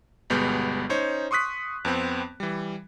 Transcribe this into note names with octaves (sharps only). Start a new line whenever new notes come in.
G1 B2 G3 G#3 B3 G6
C#4 D#4 C5 C#5
C6 C#6 D#6 F#6 B6
F2 B3 C4
E3 G3